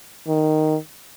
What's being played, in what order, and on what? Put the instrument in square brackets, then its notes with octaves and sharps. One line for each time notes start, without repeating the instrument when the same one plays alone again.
[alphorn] D#3